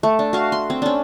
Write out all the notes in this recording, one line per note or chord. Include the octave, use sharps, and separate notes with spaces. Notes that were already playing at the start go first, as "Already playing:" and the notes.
A3
D4
F#4 F5
C6
C4
C#4 D4